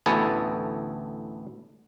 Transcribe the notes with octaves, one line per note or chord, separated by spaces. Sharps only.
A1 D2 B3 E4 A4 G#5